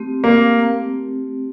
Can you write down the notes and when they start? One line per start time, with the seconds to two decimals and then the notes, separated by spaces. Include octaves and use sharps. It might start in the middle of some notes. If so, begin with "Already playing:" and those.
Already playing: A3 C4 G4
0.24 A#3